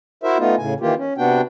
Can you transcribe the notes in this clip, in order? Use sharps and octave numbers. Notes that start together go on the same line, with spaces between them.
E4 F#4 A#4 C5 E5
A3 B3 D#4 F4
A2 C#3 G#5
D#3 E3 A#3 F4 G4
C#4
C3 B3 D4 F#4 G5